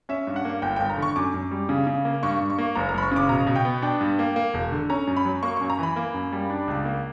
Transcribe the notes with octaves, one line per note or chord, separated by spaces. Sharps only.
C#4 E5
G2
F#5
A#3
G1 G5
G1 G5
A#5
D3 C#6
F#2 D6
F#2
G3
C#3
C#3
A#3
G2 C#6
G2
C#6
A#3
F#1 A#5
A#5
F#1 B5
C#6
C#3 D6
B2 A#5
B2
G5
B3
D4 G5
G2
A#3
A#3
E1
D3
C#4 A#5
F#2
B5
F#3
A#3 C#6
F#2 C#6
A#5
E3 B5
A#3
F#2
G3
D4
C#2
A#3